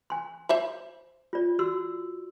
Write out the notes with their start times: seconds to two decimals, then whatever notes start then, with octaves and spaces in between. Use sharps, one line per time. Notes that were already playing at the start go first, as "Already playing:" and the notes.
0.10 G#5 C6
0.49 C5 E5 B5
1.33 F4 D5
1.59 F#4 C6 E6